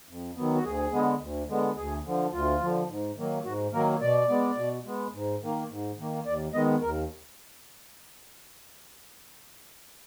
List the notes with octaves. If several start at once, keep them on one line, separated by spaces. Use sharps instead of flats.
F2
D#3 F#3 B3
F#4
D2 G#4
D3 G#3 B3
D2
D3 G#3 B3
D2 G#4
D3 F3
D2 F4
D3 F3
G#2
D#3 F#3 A#3
G#2 F#4
D#3 F#3 A#3 A#4
B2 D5
G#3 B3
B2
G#3 B3
G#2
D#3 A#3
G#2
D#3 A#3
D#2 D5
D#3 G#3 B3 D#5
D#2 A#4